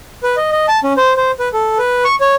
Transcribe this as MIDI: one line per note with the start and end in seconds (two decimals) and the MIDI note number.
0.23 0.36 71
0.37 0.51 75
0.52 0.66 75
0.68 0.80 81
0.84 0.93 61
0.97 1.13 72
1.17 1.31 72
1.39 1.49 71
1.53 1.78 69
1.78 2.04 71
2.05 2.15 85
2.21 2.35 73